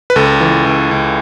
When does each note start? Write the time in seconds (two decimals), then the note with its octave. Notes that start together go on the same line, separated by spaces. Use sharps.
0.10 B4
0.16 C#2 A4
0.41 E3
0.66 C#2
0.91 C#2